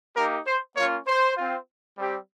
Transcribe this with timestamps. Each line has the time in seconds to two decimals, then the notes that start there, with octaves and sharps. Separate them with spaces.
0.17 A#3 D#4 G4 A#4
0.47 C5
0.76 A#3 C#4 F4 C#5
1.06 C5
1.37 C4 F4
1.97 G3 C4 G4